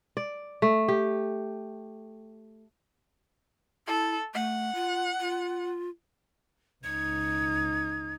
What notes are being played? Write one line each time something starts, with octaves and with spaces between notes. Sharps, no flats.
D5
A3
G4
E4 A4
A3 F#5
F4
F4
C#2 D#4 G#6